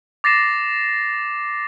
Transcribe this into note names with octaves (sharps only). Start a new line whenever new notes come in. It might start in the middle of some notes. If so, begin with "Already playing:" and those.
D6 A6 A#6 C7 E7